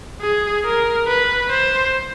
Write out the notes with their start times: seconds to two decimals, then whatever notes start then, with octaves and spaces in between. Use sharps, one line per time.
0.21 G#4
0.64 A#4
1.08 B4
1.50 C5